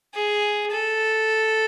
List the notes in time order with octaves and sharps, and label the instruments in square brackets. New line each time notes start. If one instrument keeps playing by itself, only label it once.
[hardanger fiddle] G#4
A4